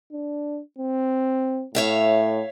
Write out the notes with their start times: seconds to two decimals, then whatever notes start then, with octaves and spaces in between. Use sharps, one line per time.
0.12 D4
0.79 C4
1.75 A2 C#5 E5 F5